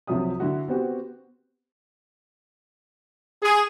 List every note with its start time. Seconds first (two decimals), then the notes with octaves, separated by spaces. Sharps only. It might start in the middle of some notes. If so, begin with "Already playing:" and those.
0.07 C2 C3 F3 F#3 E5 D#6
0.40 D3 E4 F#4
0.68 B3 C4 F#4 G4
3.42 G#4